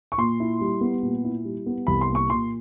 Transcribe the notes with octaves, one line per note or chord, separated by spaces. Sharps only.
C#6
A#2 C6
E4
G3
B3
A#2
E4
G3
B3
C2 B5
C6
A#3
C#6
A#2 C6